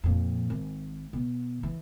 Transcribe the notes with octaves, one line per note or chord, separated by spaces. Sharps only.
F2 A#2
G#1
B2
E3